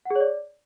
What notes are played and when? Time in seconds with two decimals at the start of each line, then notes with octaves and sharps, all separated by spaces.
0.05 F#5
0.10 G#4
0.16 C#5
0.21 D5